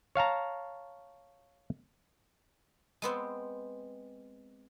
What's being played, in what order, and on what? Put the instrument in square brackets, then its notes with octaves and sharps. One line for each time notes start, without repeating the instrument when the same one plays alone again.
[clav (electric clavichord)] C#5 F5 A5 A#5
[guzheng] G#3 B3 C4